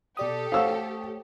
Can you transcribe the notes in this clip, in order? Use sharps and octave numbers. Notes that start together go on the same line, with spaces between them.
B2 G4 A4 D5 D#6
A3 C5 C#5 F5 F#5 D#6 E6